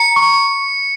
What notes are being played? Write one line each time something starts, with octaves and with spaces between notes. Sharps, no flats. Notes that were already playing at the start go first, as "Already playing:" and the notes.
Already playing: A#5 C#7
C#6